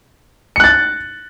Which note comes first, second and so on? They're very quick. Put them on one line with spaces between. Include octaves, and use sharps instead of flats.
C#7 F#6 A6